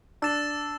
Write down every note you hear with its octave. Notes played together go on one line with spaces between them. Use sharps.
D4 E6 A6 E7